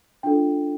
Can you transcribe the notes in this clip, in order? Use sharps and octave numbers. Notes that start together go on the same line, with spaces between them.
D4 F4 A4 G5